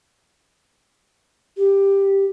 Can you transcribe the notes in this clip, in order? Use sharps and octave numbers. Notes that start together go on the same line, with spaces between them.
G4